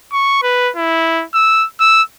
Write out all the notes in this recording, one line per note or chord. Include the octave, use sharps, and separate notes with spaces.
C#6
B4
E4
E6
E6